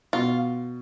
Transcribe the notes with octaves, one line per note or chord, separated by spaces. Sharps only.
B2 F4